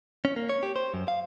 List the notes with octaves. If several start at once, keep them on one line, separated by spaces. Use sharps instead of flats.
C#4
A#3
C#5
G4
C5
F#2
F5